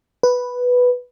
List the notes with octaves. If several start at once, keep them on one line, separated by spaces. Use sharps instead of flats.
B4